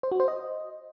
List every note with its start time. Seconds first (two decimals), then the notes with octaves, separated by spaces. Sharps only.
0.03 C5
0.12 F#4
0.20 C5
0.28 D#5